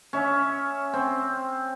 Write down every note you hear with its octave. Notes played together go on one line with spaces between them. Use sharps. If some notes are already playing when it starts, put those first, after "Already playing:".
C#4 E5
C4